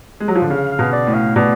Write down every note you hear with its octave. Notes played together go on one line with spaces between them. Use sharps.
G#3
F#3
F3
D3
C#3 F5
F5
B2
D5
A2
F5
B2 D5